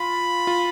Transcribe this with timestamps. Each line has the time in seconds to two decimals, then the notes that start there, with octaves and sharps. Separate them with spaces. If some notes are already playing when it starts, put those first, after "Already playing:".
Already playing: F4 B5
0.47 F4